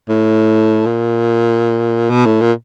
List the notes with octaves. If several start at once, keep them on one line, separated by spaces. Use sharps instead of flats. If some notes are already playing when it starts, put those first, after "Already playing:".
A2
A#2
B2
A2
A#2